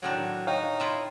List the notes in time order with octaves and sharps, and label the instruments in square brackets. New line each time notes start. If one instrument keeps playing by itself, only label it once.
[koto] A2 D#3 D4 [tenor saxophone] F#3
[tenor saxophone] D#4 [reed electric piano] C#5 F5 G5
[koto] E4 F4 E5